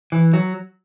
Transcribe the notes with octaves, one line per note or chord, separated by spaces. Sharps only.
E3
F#3